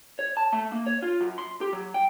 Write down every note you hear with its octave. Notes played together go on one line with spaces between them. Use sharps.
C#5
A5
A3
A#3
C#5
F4
F#2
C6
G4
F#3
G5